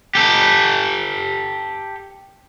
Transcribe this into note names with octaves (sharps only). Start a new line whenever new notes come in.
G4 A4